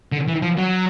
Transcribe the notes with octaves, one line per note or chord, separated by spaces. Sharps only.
D3
E3
F3
F#3